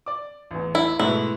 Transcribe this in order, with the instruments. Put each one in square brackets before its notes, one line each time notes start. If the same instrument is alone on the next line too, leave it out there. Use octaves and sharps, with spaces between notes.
[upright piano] D5 D6
A1 E2
[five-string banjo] E4
[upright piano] G#2 B2 A3 [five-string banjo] E4